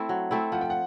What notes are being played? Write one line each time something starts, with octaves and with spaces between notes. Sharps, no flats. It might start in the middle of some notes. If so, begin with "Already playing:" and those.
Already playing: A3 C4 E4
F#3
A3 C4 E4
F3 F#5
G5
F#5